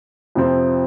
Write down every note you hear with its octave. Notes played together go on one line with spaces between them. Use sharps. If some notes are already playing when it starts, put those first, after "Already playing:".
F2 C3 F3 C4